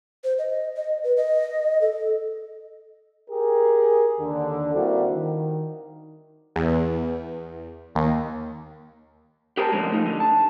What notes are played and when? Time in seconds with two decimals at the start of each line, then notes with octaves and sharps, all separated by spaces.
0.24 C5
0.39 D#5
0.76 D#5
1.04 B4
1.17 D#5
1.81 A4
3.30 G4 G#4 A#4
4.20 D#2 D3
4.74 G3 A#3 C4 D4 E4 F#4
5.13 D#3
6.56 E2
7.95 D#2
9.57 G4 G#4 A#4 C5 E5 A5
9.72 F#2 D3 F3 G3 G#3
9.92 F3 A3 D#4
10.06 D3
10.20 A5